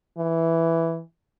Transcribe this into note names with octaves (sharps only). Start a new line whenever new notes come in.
E3